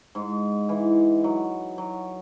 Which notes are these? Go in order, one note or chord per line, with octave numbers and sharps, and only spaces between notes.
G#2
E3
F#3
F#3